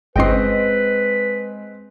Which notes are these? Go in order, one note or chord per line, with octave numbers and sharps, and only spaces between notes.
G1 G#3 C4 B4 D#5 G5 C6